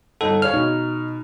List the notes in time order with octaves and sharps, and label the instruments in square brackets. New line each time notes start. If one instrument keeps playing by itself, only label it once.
[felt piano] G1 D#4 F#5 [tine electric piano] A4
[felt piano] G#4 C#5 F5 [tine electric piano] F6
[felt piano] B2 [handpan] D#4